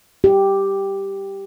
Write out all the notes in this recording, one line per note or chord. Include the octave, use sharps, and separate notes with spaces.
G4